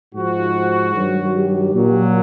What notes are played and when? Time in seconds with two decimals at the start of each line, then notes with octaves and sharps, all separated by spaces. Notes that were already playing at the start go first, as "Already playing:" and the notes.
0.15 G#2 F3 F#4
0.95 G2 D#3 F#3
1.35 G4
1.75 A#2 F#3